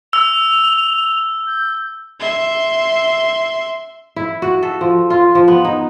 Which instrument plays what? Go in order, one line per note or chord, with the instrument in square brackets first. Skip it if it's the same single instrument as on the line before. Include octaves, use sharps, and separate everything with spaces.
[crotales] E6 [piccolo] F7
[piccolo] G6
[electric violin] E5 C6
[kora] E4
F#4
A4
F3
F4
F3
B3
D#4